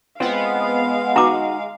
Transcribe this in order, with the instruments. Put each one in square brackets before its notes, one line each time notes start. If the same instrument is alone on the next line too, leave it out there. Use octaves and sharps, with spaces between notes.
[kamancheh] G#3 F5 [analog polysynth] B3 [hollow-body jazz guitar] C4 F4
[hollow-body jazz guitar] D#4 F#4 [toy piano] A#5 D6